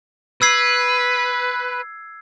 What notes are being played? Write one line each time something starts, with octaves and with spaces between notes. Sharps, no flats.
B4 E6 G#6 C7